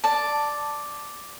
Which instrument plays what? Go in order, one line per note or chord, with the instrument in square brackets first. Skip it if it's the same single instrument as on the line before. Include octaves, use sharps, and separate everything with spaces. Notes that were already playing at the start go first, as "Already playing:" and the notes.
[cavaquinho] D5 A5